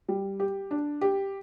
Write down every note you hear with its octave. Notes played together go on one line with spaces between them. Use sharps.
G3
G4
D4
G4